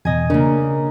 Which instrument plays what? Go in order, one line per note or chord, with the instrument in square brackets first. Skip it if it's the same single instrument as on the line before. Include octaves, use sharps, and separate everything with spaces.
[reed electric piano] E2 B2 [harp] D#5 G#5
[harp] C#3 A#3 [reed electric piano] D4 A#4